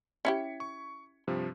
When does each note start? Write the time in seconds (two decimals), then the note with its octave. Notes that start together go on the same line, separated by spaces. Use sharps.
0.25 C#4 E4 G4 G#6 B6 C#7
0.60 C#6
1.27 G2 C3 F3